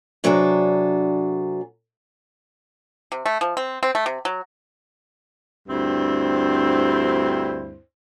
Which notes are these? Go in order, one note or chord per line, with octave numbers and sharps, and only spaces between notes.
C3 F#3 D4 G#4 A4
C3
A3
F3
C4
C4
A3
C3
F#3
D2 G2 C4 E4 C5